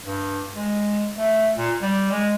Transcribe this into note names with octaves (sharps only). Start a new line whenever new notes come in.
G2
G#3
A3
A#2
G3
G#3